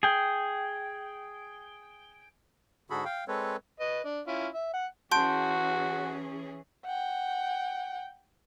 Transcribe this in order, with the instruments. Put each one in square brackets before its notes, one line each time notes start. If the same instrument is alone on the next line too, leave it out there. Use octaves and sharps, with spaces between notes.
[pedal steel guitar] G#4 G5
[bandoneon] G#2 D3 F#4 G#4 A4 B5
F5 G5
G#3 C4 A4 B4 C#5
[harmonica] B4 D#5
D4
C#4 E4 F4
E5
F#5
[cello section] E3 C#4 G#4 [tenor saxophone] F#4 [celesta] A5 [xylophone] C6 G6 D7
[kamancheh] F#5 G5